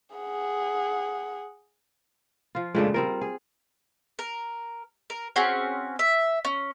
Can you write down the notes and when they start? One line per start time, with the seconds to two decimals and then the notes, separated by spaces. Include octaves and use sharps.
0.16 G#4 F#5
2.55 F3 F4
2.75 A#2 C#3 G#3 A3 D4
2.94 G3 C4 F4 A#4
3.21 G#4
4.19 A#4
5.10 A#4
5.36 C4 C#4 F#4 G#4
5.99 E5
6.45 C#4